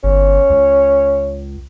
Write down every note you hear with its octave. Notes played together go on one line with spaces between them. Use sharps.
G1 C#4
C#2